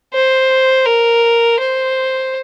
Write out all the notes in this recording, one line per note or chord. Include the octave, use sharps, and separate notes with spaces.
C5
A#4
C5